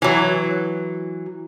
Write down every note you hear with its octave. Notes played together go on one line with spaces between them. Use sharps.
E3 F#3